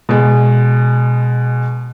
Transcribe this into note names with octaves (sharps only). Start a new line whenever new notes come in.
B2 G#3